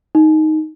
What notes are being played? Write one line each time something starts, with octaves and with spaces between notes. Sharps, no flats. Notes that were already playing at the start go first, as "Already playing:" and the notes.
D#4